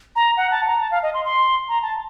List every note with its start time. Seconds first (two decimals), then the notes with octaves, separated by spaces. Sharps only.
0.16 A#5
0.37 F#5
0.51 A5
0.67 A#5
0.80 A5
0.91 F5
1.03 D#5
1.14 C6
1.25 C6
1.69 A#5
1.82 A5